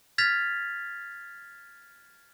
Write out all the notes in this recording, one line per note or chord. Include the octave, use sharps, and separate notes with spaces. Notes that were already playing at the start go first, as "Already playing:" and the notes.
F6 G#6 A6 B6 F7